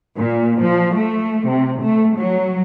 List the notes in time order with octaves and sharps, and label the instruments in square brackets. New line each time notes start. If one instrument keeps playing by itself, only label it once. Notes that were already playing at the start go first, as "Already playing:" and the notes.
[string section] A#2
F3
A3
C3
A3
F#3